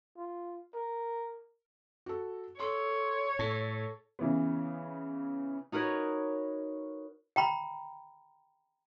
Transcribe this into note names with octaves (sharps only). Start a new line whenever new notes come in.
F4
A#4
F#4 A4
A4 C#5 C6
A2 A4 A5
C#3 E3 B3
D#4 F#4 A#4 B4 C#5
G5 A#5 B5